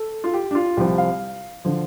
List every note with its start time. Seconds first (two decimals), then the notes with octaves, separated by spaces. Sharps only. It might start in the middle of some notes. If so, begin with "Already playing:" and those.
Already playing: A4
0.24 F4
0.34 G4
0.51 D4
0.55 F4
0.77 C2 C3 F3 G4
0.98 F5
1.65 D3 F3